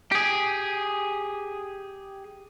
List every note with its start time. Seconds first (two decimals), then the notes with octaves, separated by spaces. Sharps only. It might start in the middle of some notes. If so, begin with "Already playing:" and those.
0.12 G4 G#4